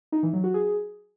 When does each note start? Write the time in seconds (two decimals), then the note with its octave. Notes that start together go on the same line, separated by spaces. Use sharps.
0.12 D#4
0.23 E3
0.33 F#3
0.44 F#4
0.54 G#4